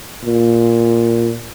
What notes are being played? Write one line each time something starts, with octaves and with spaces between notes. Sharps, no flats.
A#2